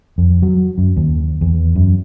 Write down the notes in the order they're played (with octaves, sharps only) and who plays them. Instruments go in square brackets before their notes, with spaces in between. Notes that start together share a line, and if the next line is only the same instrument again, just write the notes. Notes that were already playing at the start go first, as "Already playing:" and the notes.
[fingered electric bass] F2
F#3
F#2
D#2
E2
F#2